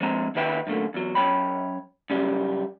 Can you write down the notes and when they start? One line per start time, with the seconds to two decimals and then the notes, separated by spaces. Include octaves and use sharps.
0.01 F3 G#3 C4 G#5 A#5
0.35 D#2 D#3 B4 E5 G5
0.67 F#2 D3 A3 A#3
0.94 E2 F#3
1.15 F#2 G#3 C#5 G5 B5
2.10 F#2 C#3 G3